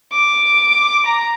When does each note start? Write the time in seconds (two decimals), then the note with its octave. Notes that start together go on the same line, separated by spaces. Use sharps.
0.12 D6
1.06 A#5